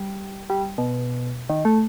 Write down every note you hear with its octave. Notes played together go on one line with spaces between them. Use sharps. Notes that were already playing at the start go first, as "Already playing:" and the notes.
Already playing: G3
G3
B2
D#3
A3